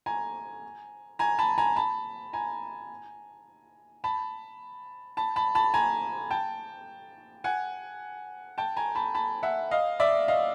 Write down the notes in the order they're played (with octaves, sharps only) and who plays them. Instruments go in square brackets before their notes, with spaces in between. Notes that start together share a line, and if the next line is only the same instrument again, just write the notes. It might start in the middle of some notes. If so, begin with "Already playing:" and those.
[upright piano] G#5 A#5
G#5 A#5
A5 B5
G#5 A#5
A5 B5
G#5 A#5
A5 B5
A5 B5
A5 B5
A5 B5
G#5 A#5
G5 A5
F#5 G#5
G5 A5
G#5 A#5
A5 B5
A5 B5
E5 F#5
D#5 F5
D5 E5
D#5 F5